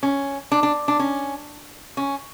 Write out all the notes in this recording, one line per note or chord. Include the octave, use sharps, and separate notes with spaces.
C#4
D4
D4
D4
C#4
C#4